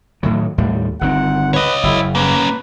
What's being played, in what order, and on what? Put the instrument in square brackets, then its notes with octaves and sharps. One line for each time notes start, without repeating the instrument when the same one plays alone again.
[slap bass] A2 D#3 F#3
D#2 A2 G3
[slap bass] G1 D#3 C4 [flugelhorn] F#5
[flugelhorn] B4 [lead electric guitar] C#5 D#5
[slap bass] F#1 [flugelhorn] E4
[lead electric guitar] A#3 C#4 [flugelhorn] B4